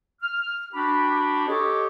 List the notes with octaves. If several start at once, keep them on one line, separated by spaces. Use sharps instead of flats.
F6
D4 F#4 G4 B5
G4 A4 C#5 D#5